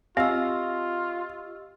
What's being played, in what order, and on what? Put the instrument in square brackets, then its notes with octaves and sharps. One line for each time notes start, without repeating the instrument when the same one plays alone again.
[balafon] C4 [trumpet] F4 [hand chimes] G4 D#5 E6 [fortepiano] F5